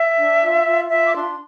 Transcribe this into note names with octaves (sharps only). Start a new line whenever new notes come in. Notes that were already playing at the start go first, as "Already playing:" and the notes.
Already playing: E5
D4
F4
F4
F4 E5
D6
D4 C6